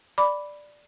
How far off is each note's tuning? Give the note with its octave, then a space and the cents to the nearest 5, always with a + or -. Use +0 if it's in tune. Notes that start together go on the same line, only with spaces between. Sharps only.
D5 +0 B5 +0 D6 -15